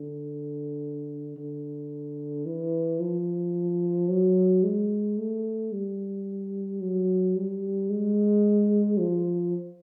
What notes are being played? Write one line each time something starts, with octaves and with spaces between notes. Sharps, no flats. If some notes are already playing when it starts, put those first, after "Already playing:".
Already playing: D3
D3
E3
F3
F#3
G#3
A3
G3
F#3
G3
G#3
F3